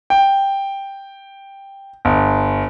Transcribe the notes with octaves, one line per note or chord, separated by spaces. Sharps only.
G5
G1